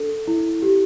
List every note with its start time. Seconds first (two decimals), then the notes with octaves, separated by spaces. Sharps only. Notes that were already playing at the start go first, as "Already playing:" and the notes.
Already playing: D4 A4
0.27 E4
0.62 G4